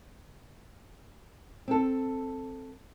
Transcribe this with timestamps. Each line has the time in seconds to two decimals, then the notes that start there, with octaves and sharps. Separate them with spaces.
1.68 C4 A4